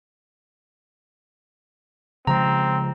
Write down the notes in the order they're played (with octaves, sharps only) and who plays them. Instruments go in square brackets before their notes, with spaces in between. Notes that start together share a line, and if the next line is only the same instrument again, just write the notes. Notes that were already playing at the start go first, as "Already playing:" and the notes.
[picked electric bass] C#3 F3 G#3 [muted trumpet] C4 [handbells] A#5